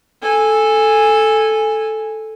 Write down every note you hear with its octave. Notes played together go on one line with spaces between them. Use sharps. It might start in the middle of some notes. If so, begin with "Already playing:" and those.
A4 G#5